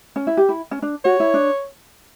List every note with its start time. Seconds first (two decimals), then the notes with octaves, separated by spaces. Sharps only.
0.16 C#4
0.27 E4
0.37 G4
0.49 E4
0.71 C#4
0.82 D4
1.05 F#4 C#5
1.20 E4
1.34 D4